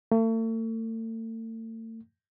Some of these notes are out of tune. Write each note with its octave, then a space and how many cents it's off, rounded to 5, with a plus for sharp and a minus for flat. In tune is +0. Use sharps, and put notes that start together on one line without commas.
A3 +40